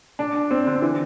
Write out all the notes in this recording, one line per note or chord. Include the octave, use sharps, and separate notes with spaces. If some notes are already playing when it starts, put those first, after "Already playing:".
D4
C4
D3
E3